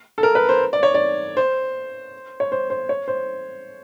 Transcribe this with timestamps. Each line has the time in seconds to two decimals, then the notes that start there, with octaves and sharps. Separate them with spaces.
0.18 A4
0.23 A#4
0.35 B4
0.49 C5
0.73 D5
0.83 C#5
0.94 D5
1.37 C5
2.40 C#5
2.52 C5
2.70 C5
2.89 C#5
3.08 C5